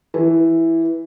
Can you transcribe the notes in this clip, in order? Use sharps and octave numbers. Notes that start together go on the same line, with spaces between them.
E3